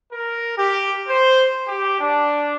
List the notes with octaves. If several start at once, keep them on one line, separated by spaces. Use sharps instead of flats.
A#4
G4
C5
G4
D4